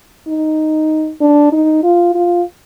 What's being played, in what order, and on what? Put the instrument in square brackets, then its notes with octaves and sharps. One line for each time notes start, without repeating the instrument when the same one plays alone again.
[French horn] D#4
D4
D#4
F4
F4